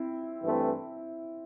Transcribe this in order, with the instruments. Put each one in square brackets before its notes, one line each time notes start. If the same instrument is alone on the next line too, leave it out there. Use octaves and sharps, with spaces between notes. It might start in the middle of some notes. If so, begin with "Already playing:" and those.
Already playing: [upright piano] C4 E4
[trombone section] G2 E3 A3 C4